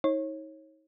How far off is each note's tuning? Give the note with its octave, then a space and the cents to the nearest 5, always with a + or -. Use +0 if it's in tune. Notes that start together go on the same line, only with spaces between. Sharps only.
D#4 +35 C#5 -30